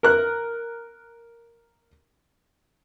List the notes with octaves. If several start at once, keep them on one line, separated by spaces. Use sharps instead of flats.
A#4 F#6